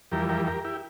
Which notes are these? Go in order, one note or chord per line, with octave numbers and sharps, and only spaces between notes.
F2 E3 G3 G4 A#4
G4 A#4
G4 A#4
E4 G4